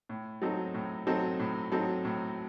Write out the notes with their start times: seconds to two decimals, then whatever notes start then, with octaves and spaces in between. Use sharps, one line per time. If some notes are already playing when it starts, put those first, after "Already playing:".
0.09 A2
0.42 F#3 C4 D#4 A4
0.74 A2
1.07 F#3 C4 D#4 A4
1.39 A2
1.72 F#3 C4 D#4 A4
2.05 A2